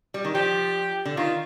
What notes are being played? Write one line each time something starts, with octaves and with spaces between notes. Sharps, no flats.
G3
D#3
F3 G4
D3
D#3 F4